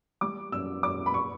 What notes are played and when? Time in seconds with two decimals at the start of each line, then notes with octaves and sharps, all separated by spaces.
0.21 G3 D6
0.52 F#2 E6
0.83 F#2 D6
1.06 B5
1.14 C#6